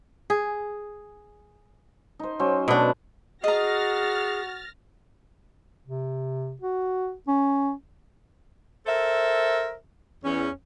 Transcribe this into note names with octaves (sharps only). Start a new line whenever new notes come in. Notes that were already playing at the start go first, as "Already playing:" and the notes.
G#4
D#4 C5
F#3 C#4 C5
B2 A3 B3 D4 F#4
F#4 G#4 D#5 A#5 F6 A6 A#6
C3
F#4
C#4
A4 A#4 C5 E5
E2 C#4